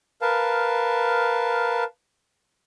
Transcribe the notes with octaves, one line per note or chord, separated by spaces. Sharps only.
A#4 B4 F5 A5